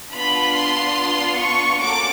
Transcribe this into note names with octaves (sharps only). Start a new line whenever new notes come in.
B3 D4 F4 B5
C6
C#6
A#3 C#4 F#4 A4 D6